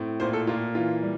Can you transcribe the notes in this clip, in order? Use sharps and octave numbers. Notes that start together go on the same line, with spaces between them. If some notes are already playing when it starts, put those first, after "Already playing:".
Already playing: A2 C4
A#2 C5
A4
A#2 F4
E3 F4
G3